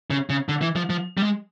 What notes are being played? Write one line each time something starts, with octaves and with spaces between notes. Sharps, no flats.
C#3
C#3
D3
E3
F3
F3
G3
G#3